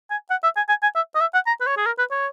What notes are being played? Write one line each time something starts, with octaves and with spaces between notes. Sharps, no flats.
G#5
F#5
E5
G#5
G#5
G#5
E5
D#5
E5
F#5
A#5
B4
C#5
G#4
A#4
B4
C#5